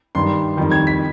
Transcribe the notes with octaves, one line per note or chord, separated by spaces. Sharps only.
G2 D#3 G3 C6
F2 D#3 G3
G#6
B6